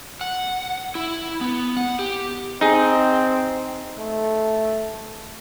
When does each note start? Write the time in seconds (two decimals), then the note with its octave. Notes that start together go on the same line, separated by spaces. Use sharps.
0.21 F#5
0.95 E4
1.41 B3
1.77 F#5
1.99 G4
2.61 C4 D#4 G#4
3.98 A3